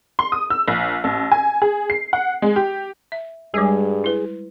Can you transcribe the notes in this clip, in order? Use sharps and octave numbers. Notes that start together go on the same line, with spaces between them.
C6
D#6
E6
A#1
A1
G#5
G#4
C7
F#5
G#3
G4
E5
G2 G3 G#3 G#4
E4 B4